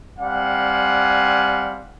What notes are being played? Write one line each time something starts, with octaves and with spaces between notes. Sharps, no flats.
G3 C4 D5 F5 F#5 G#5